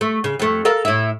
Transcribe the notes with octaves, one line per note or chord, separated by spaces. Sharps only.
A3
C#3
F2 A3
A4 A#4 F5
A2 E4